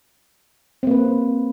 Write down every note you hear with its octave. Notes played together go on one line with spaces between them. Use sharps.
A#3 C4 B4